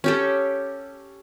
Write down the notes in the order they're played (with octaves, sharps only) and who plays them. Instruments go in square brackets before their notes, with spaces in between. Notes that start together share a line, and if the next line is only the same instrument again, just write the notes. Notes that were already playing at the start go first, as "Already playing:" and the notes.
[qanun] C#4 G4 A4